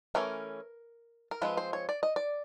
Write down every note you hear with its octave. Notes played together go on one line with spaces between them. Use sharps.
E3 A3 C#4 A#4
A#4
F3 G#3 C4 B4
C5
C#5
D5
D#5
D5